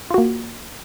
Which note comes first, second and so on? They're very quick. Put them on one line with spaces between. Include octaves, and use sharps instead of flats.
F4 F#4 A#3